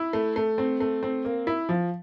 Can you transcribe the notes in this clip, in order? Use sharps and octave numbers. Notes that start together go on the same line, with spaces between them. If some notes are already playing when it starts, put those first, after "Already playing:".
Already playing: E4
A3
A3
C4
A3
C4
A#3
E4
F3